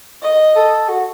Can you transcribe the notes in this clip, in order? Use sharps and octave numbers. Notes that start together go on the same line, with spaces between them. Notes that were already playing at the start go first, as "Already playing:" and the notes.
D#5
A4
F#4